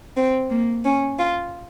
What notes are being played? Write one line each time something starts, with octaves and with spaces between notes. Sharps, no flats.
C4
A#3
C#4
F4